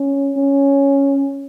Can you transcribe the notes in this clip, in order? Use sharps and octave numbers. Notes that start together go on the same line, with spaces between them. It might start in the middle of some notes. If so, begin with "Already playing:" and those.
Already playing: C#4
C#4